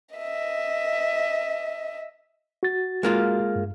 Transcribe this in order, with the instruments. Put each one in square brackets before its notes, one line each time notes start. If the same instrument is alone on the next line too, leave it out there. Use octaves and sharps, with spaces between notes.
[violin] D#5 E5
[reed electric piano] F#4 A6
[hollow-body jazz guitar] G#3 A#3 F4
[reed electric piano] G2